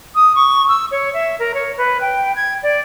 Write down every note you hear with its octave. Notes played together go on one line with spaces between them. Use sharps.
D#6
C#6
E6
C#5
E5
A#4
C#5
B4
G5
G#6
D5